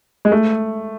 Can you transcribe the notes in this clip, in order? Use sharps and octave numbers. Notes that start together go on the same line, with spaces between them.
G#3
A3